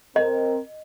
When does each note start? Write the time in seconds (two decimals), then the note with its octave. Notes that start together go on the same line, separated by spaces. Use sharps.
0.16 C4 A#4 D#5